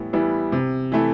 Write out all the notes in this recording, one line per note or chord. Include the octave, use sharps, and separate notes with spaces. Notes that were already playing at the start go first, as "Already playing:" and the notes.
Already playing: A2 E3 G3 B3 E4
E3 G3 B3 E4
C3
E3 A3 E4